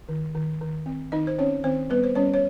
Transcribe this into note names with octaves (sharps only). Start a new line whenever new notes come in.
D#3
D#3
D#3
C4
D#3 D#4 D#5
C5
C4 C#4 C#5
D#3 C4 C5
G3 B3 B4
C5
G3 C#4 C#5
C#5